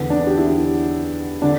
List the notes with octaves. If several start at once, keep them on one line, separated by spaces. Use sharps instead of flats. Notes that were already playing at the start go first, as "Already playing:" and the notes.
Already playing: E2 D3 B3
D4
G4
E4
D3 D4